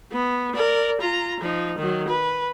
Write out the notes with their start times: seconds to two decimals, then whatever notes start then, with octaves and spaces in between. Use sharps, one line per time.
0.12 B3
0.55 A#4 D5
1.01 F4 A#5
1.40 F3 D#4
1.78 D#3 F#3
2.08 B4